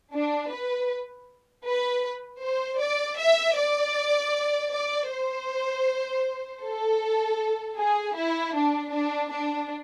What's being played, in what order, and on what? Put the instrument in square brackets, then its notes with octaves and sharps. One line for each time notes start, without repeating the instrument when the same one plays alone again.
[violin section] D4
B4
B4
C5
D5
E5
D5
D5
C5
A4
G#4
E4
D4
D4
D4